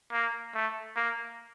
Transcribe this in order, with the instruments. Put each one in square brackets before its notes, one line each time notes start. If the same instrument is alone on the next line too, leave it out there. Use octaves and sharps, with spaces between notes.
[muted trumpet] A#3
A3
A#3